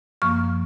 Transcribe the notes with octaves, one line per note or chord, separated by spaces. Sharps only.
F#2 F3 A#3 C#6 F6